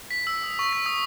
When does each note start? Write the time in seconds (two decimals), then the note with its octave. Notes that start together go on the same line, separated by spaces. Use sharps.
0.11 B6
0.27 E6
0.43 D#6
0.59 C#6
0.73 B6
0.86 D#6